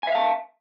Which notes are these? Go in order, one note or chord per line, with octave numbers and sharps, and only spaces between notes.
E5 F5 G#5 A5